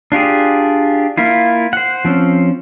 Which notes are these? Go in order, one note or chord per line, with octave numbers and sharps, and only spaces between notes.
D4 F4 G4 G#4
A#3 E4 F4
C5 F#5
F3 C4 C#4